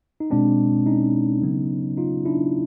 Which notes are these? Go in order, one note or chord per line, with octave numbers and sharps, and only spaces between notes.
D#4
B2 G#3 C4 D4
C#4 D#4
C#3 F#3 B3
D#4 F4
D4 E4